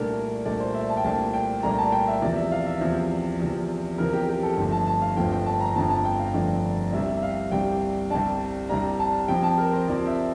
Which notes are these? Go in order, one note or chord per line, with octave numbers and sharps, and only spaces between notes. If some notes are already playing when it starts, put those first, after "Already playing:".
Already playing: C2 A#2 A3 D4 A#4
C2 A#2 A3 D4 D5
C5
E5
A5
G5
C2 A#2 A3 D4 A5
G5
C2 A#2 A3 D4 A#5
A5
G5
E5
E2 C3 F3 D5
E5
F5
E5
E2 C3 F3
E2 C3 F3
E2 C3 F3 A#4
G4
G4
A4
G1 F2 D3 F3 A3
A5
A5
F5
G1 F2 D3 F3 A3 G5
G5
A5
A#5
G1 F2 D3 F3 A3 A5
A5
G5
F5
G1 F2 D3 F3 A3 D5
C2 C3 G3 D4 E5
E5
F5
C2 C3 G3 D4 G5
C2 C3 G3 D4 A5
C2 C3 G3 D4 A#5
A5
F2 C3 F3 C4 G5
A5
A#4
C5
F2 C3 F3 C4 D5
E5